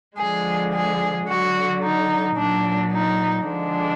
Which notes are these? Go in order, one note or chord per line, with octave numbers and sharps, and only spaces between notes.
D3 F3 G#3 G#4
G#4
D3 F#3 F#4
D#4
A#2 F#3 D4
D#4
D3 F3 G#3 D4